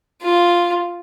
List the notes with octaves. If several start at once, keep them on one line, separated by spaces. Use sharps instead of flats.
F4